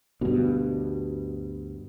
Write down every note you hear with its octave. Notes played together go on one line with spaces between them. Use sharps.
D2 G2 B2